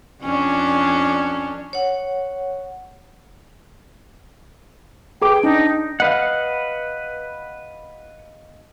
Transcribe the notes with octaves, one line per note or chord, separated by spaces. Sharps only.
F2 C#4 D4
C#5 F#5
G#4 B4 G5 D6
D4 D#4
B4 D#5 F5 F#5